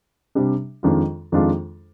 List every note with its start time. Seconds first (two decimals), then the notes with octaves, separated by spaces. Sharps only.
0.35 C3 G3 D4
0.83 F2 D#3 G#3 D4 F4
1.32 F2 D#3 G#3 D4 F4